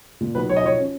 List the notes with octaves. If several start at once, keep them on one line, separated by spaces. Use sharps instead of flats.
A#2
B1 B4
B1 C#5
D#5
F3 C#5
C#4